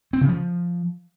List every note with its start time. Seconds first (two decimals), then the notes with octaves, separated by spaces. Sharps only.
0.13 C4
0.21 C#3
0.29 F3